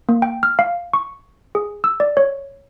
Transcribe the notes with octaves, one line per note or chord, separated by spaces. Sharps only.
A#3
G5
F6
F5
C#6
G#4
E6
D5
C#5